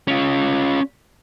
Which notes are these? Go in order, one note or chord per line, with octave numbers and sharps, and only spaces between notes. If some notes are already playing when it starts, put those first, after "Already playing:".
C#4 F4